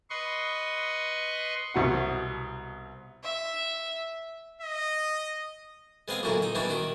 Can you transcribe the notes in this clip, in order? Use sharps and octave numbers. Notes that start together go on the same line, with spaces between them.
B4 D#5 C6 C#6
C2 B2 F#5
E5
D#5
G#3 B3 C4 G#4 F5
B1 A#2 D3 E3 F#4 A#5
D#4 D#6
B2 E3 G3 C#4 D4 G4
D#3 F#4 G4